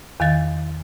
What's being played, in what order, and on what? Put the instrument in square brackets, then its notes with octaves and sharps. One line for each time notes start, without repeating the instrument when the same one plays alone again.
[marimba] E2 D#3 F5 A6